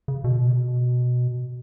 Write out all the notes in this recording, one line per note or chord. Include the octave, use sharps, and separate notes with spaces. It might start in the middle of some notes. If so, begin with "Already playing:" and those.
C#3
B2